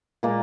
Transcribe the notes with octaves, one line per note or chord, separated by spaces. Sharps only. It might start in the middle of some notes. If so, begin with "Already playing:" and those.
A#2 G#3 A#3